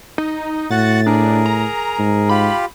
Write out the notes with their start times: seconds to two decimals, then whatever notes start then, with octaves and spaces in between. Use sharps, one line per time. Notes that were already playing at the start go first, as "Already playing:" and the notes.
0.18 D#4
0.71 A2 F#4 F#5 A6
1.07 D4 G#4 A#4
1.46 A#5
1.99 G#2
2.29 F4 G4 B5